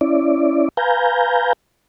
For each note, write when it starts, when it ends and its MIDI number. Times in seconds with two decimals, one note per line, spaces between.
0.01 0.69 61
0.01 0.69 64
0.01 0.69 74
0.77 1.53 71
0.77 1.53 77
0.77 1.53 80
0.77 1.53 82
0.77 1.53 91